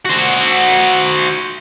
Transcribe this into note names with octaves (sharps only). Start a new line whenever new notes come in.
F#4 C5